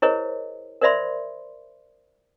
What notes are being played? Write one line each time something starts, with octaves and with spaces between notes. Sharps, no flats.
E4 G#4 A#4 C5 C#5 D#5
A#4 C5 D5 E5 B5 C6